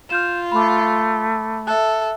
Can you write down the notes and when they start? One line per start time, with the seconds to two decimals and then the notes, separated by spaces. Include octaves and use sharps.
0.10 F4 F6 G6 E7
0.52 A3 B5 D6
1.67 A4 E5 F#6